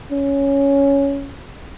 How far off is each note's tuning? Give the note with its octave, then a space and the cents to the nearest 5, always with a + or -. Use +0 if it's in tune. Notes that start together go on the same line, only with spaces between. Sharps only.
C#4 +5